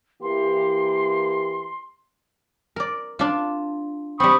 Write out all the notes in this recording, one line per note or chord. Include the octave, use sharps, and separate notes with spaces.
E3 A#3 G4 C6
A#4 D5
D4 F4
G3 C4 B5 C#6 D#6